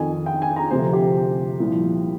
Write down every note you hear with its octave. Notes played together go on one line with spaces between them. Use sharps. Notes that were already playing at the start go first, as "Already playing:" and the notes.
Already playing: F2 D#3 G#5
G5
G#5
A#5
D2 C3 F3 C5
G4
C2 A#2 F3